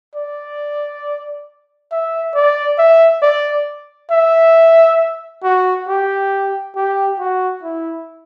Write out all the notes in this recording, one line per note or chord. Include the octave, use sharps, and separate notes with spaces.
D5
E5
D5
E5
D5
E5
F#4
G4
G4
F#4
E4